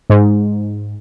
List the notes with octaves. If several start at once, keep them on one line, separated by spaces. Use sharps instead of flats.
G#2